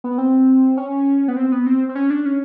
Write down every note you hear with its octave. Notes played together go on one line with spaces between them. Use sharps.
B3
C4
C#4
B3
C4
B3
C4
C4
C#4
D4
C#4